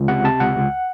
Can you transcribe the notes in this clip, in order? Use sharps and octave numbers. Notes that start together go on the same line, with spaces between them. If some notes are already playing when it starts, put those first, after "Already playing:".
Already playing: C#2
C3 F#5
C3 A5
C#2 F#5
C#2